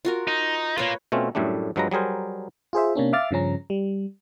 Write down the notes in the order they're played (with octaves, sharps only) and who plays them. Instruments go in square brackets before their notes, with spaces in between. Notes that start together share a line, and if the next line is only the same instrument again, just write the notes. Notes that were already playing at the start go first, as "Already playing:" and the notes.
[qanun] F4 F#4 A#4
[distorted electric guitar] D#4
[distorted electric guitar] A#3 F4 [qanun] B4 C#5
[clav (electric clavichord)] B2 A3 C4 C#4 F4
F#2 A2 G3 A3 D4
G2 F3 F#3 G#3 B4 A#5
F#3 G3 G#4 A#4 C5
[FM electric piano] F4 G#4 C5 E5
C3 A#3 C#4 D4
E5 F5 D6 F6 A6
G2 C#3 F3 C#4 A#5
G3